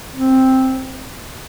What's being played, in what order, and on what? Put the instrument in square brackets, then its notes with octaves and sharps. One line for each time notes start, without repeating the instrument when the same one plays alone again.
[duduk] C4